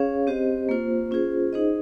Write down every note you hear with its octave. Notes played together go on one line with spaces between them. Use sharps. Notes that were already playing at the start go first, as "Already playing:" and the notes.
Already playing: C#4 G#4 C#5 F5
C4 G4 C5 D#5
A#3 F4 C5
C#4 F4 G#4 C5
D#4 G#4 C5 D#5